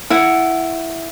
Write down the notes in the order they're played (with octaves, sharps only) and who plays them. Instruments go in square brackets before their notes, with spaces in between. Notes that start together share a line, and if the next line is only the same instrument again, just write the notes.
[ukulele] E4 F#5